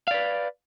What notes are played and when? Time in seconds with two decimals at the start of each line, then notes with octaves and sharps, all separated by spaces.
0.08 F5
0.11 D5
0.14 B4